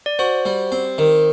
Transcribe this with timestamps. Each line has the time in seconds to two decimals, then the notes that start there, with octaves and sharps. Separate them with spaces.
0.06 D5
0.19 F#4 C5
0.45 G3
0.72 C4
0.98 D#3